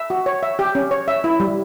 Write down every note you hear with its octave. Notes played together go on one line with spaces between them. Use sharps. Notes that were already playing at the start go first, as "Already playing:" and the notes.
Already playing: E5
F#4
C#5
E5
G4
C#4
C#5
E5
E4
G3